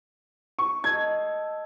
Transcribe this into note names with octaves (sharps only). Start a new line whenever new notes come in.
C#6
A4 D#5 G#6